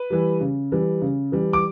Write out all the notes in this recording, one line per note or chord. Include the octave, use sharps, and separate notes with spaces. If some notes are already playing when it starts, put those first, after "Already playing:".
Already playing: B4
E3 G3
C#3
E3 G3
C#3
E3 G3
D6